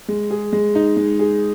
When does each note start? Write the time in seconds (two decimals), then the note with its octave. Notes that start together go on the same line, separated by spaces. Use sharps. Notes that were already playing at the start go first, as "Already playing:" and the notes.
0.08 G#3
0.30 G#4
0.53 G#3
0.75 D#4
0.97 G#3
1.19 G#4